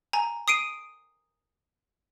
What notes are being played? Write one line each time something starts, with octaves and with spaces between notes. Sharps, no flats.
G#5 A#5
D#6 C7 D7 D#7